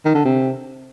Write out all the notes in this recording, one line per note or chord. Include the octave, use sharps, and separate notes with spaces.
D#3
D3
C3